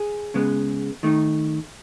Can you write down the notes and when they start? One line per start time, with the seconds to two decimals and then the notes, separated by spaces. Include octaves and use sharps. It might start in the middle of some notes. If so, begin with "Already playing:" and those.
Already playing: G#4
0.34 C#3 G#3 B3
1.03 D#3 A3 D#4